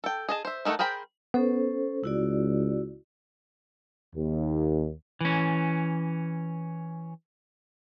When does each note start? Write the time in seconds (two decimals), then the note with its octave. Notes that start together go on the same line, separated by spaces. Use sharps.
0.04 A4 G5
0.29 G#4 D#5 A5
0.45 C5 E5
0.65 D#3 A3 D#4 A4 F#5
0.79 G#4 A#4 C5 G5 B5
1.34 B3 C#4 A4 C5
2.04 C#2 E4 F#4 D5
4.15 D#2
5.21 E3 C#4